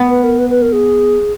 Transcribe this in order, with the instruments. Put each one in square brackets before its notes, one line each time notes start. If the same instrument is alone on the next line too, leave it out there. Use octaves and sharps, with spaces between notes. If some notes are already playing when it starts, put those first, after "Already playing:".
Already playing: [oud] B3
[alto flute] B4
A#4
B4
B4
A#4
G#4